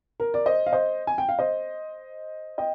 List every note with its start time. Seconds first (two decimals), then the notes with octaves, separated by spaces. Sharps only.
0.20 A#4
0.34 D5
0.46 C5 D#5
0.66 F5
0.73 C5 D#5
1.07 G#5
1.18 G5
1.29 F5
1.39 C5 D#5
2.58 D#5 G5